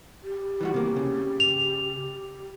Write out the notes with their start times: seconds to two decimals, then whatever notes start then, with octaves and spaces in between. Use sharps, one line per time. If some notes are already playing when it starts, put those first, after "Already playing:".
0.23 G4
0.61 E3 G3 F#4
0.74 C3 A#3
0.96 C#3
1.40 F7